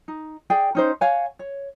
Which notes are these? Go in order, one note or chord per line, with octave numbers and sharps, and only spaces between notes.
D#4
G#4 D5 G5
C#4 D#4 C5
C#5 F5 F#5 G#5
C#5